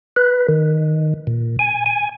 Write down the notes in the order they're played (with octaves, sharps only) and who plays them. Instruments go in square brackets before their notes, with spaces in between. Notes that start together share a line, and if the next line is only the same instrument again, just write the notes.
[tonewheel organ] B4
D#3
A#2
G#5
G#5